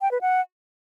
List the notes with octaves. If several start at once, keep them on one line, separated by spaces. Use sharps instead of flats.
G5
B4
F#5